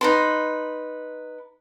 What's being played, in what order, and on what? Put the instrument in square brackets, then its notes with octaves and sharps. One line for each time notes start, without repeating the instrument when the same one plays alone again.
[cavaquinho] D#4 B4 C6